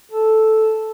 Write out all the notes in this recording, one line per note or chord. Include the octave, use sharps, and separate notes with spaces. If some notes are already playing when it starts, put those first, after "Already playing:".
A4